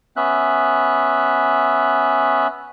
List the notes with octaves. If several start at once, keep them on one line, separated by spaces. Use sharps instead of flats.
B3 C#4 E5 F#6